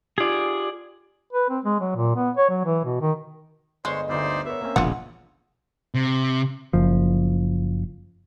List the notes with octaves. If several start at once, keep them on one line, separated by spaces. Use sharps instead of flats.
F4 G4 G#4 D5
B4
C4
G#3
F#3
A#2
B3
C#5
F#3
E3
B2
D#3
G1 G#3 C5 C#5 D#5 C6
G1 D2 D#4 C5 D5
B3 A#4 C#5 E5
A#3 C4 C#4
E1 A#1 C#3 G#3 F4 F#5
C3
F#1 F3